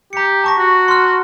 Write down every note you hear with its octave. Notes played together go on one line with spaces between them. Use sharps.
G4 A#5 C#7
A5 C#6 A#6
F#4
C6 F6